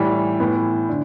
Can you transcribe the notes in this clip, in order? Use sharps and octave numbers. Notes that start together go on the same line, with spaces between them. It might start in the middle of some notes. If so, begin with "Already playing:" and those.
Already playing: A2 E3 G3
A2 E3 B3
D3